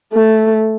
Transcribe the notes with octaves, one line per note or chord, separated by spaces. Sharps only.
A3